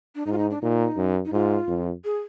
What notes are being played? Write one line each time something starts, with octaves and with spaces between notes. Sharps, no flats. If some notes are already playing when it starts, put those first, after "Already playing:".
D4
G#2 D#4
F4
D#4
D4
A#2 D#4
F#2
D#4
G#2 F4
F2
G#4